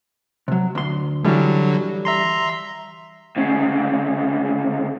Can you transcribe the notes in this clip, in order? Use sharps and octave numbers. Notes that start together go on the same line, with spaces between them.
C3 F#3
D2 C6
D3 E3 F#3 G3
E5 A#5 C6
D2 C#3